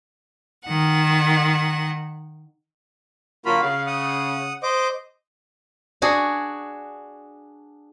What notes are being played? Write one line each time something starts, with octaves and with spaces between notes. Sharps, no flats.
D#3 F#5
D3 F#3 A#3 F4 F#4 B5
C#3 F5
F#5 D#6
C5 D#5 D6
D4 F#4 G#4